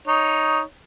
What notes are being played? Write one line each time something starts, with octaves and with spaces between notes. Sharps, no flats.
D#4 C#5